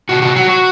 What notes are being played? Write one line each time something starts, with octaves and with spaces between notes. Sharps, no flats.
C3 F#4
F#4
F#3 F#4
F#4